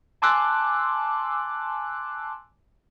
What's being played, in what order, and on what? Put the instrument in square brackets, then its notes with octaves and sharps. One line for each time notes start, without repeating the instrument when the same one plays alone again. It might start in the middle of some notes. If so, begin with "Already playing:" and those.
[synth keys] G#5 A5 C6 D6 E6 F#6